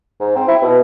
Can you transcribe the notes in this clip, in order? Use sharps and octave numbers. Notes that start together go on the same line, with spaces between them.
G#2
C4
E4
B2